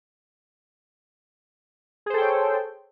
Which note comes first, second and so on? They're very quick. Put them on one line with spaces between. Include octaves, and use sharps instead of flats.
G#4 C5 A4 G5 C#5